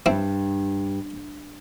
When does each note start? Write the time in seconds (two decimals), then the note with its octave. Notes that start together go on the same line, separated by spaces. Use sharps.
0.06 G2 C4 E4